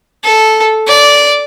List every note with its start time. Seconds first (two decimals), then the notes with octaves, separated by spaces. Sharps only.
0.24 A4
0.88 D5